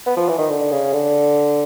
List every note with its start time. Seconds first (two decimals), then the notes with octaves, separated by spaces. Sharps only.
0.06 B3
0.17 F3
0.29 E3
0.38 D#3
0.50 D3
0.71 C#3
0.93 D3